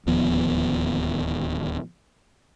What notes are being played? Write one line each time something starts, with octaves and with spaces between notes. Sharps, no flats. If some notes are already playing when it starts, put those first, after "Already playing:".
D1 D#2 F3 B3